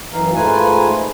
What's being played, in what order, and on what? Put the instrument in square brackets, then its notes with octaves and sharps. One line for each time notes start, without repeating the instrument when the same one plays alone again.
[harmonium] F#2 E3 D#4 F5
G#2 A3 D#4 F4 B4 G#5